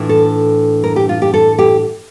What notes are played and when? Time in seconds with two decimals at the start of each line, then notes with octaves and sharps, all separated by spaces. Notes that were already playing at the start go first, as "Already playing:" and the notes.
Already playing: A2 E3 D4 F4
0.09 A4
0.84 A#4
0.96 G4
1.09 F4
1.22 G4
1.34 A4
1.59 G4